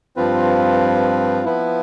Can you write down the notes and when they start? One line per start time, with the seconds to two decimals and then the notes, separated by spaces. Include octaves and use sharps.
0.16 G2 F3 C4 F4 B4
1.44 F3 B3 E4 B4